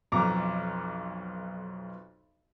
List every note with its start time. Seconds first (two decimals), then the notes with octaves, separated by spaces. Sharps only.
0.12 B1 F2 A#5 D6